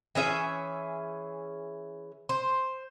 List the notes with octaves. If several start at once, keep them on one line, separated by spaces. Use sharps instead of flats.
E3 C#4 G#4 E5
C5